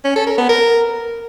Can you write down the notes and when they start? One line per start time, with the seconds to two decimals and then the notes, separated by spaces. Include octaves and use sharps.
0.05 C#4
0.16 A4
0.27 A#4
0.38 B3
0.49 A#4